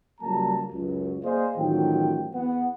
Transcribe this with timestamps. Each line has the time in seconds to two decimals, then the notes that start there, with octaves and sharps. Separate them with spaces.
0.21 C#2 F#3 G3 A#3 A5 A#5
0.71 C#2 F#2
1.24 A#3 G#4 C5 D5 D#5 F5
1.56 A1 D#3 F3 F#3 G5
2.34 E2 B3 F#5